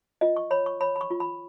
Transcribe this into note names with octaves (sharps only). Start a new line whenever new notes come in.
F4 D#5
C#6
C#5 B5
C#6
C#5 B5
B5
C#6
F4
B5